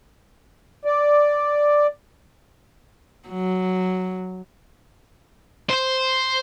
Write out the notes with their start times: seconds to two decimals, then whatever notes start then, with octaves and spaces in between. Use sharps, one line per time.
0.85 D5
3.29 F#3
5.69 C5